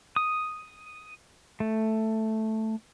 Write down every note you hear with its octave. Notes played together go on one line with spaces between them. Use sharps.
D#6
A3